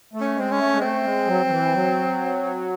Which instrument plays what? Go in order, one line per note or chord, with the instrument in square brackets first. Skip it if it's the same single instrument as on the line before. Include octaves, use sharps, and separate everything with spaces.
[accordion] A3
[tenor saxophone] C#4
[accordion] G#3 [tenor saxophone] C4
[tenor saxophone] C#4
[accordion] A3
G#3
[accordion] A3 [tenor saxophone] C4
[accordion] G#3
F#3
F#3
E3
F#3